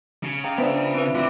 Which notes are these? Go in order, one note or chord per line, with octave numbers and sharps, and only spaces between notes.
C#3
D#5 F5 G5 A#5
F3 B3 D4 C5 E5
C4 E4 B4
D2 C4 F4 D5 E5 B5